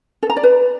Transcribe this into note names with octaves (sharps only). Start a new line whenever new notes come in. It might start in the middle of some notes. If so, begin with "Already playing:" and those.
A4
A#5
D5
B4